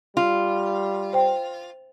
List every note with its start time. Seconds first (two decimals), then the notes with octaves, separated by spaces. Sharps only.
0.17 G3 F4
1.13 C5 G5